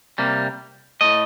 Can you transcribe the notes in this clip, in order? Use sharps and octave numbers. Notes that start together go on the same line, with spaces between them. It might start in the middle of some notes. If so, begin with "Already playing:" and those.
C3 G3 A#3
A2 A3 D#5